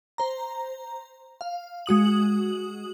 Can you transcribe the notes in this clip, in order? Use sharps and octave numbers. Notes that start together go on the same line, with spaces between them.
C5 A#5
F5
G#3 F#4 D#6 F#7